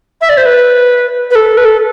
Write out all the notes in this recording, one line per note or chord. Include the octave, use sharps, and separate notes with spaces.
E5
D5
C5
B4
B4
A4
B4
A4